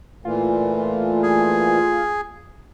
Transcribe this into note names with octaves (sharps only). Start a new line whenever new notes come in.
A#2 E3 A3 F4
G#4